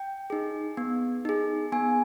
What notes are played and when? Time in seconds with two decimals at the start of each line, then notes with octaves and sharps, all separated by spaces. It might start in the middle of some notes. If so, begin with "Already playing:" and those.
Already playing: G5
0.30 D#4 G#4
0.77 B3
1.25 D#4 G#4
1.72 B3 G#5